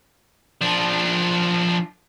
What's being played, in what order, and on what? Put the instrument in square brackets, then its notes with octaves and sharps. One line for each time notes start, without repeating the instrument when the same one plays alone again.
[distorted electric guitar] F3 D4